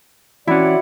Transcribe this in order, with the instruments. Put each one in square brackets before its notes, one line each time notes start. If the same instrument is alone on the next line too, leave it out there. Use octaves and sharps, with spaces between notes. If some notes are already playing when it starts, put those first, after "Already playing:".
[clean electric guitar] E3 C#4 [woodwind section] C4 D5 F#5 [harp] E4 [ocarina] F#4